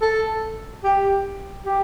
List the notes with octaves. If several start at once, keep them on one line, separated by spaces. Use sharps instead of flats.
A4
G4
G4